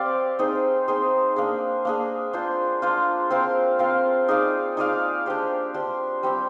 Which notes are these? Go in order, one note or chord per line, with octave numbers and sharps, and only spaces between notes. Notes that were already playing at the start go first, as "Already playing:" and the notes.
Already playing: C4 G4 D5 F5
C4 D#4 G#4 C5
C4 D#4 G#4 C5
A#3 D4 G#4
A#3 D4 G#4
D4 F4 C5
D4 F4 C5
C4 F4 A#4 F5
C4 F4 A#4 F5
D#4 G#4 D5 F5
D#4 G#4 D5 F5
D4 G4 C5
D4 G4 C5
G3 C4 G4